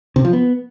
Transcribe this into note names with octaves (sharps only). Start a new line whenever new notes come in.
C3
F3
B3